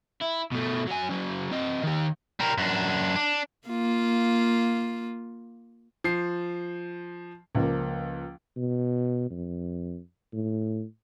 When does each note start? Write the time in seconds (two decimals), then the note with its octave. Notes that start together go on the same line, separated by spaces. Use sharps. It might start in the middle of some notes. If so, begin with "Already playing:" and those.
0.22 E4
0.52 B2 A3
0.87 F#3 G#5
1.09 C#3 F#3
1.50 C3 D#5
1.83 D#3 G4
2.40 G3 A#4
2.58 F#2 D4
3.16 D4
3.68 A#3 F4
6.04 F3 C7
7.55 C#2 F3 A#3
8.57 B2
9.31 F2
10.33 A2